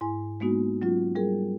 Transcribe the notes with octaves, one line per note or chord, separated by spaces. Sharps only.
G#2 E4 G#5
G#3 A#3 B3 D#4 F#4
F#3 C#4 F4
G3 G#4 A#4